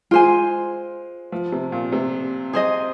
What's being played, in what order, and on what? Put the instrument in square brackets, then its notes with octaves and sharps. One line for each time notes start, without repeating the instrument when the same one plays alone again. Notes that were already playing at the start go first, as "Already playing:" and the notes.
[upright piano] G#3 [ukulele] F4 C5 G#5
[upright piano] F3
C3
A#2
C3
[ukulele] G#4 C5 D#5